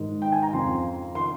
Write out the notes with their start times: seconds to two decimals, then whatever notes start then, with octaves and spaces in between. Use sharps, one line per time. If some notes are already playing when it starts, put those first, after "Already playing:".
Already playing: G#2 D#3
0.22 G5
0.32 G#5
0.43 A#5
0.53 F2 C#3 F3 C6
1.15 D#3 C6